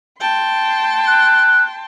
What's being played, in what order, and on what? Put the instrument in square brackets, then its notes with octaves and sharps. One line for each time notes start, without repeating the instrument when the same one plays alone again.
[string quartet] G5 A5 C6
[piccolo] F#6